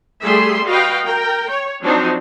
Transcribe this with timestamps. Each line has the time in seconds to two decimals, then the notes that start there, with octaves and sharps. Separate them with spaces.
0.23 G3 A3 G#4 E5 C6
0.67 F#4 B4 D#5 F5 G5
1.05 A#4 G5
1.49 C#5
1.81 F3 F#3 C4 D4 D#4